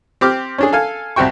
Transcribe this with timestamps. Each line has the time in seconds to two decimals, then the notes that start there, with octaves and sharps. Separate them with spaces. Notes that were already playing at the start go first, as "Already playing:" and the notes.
0.21 C4 G4 D6 F6
0.58 C#4 D4 G#4
0.72 A4 F5 G#5
1.16 C2 C3 C4 F#4 G5 C#6